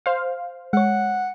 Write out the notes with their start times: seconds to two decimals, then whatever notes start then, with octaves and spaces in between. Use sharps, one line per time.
0.06 C5 F5
0.73 G#3 C#5 F#5